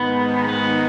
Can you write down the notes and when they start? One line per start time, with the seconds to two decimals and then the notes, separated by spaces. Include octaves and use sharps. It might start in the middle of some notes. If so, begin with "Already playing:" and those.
Already playing: G#2 D#3 G#3 B3 D#4
0.49 B3